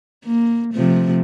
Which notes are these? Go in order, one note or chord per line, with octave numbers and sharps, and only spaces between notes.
A#3
C3 F3 A3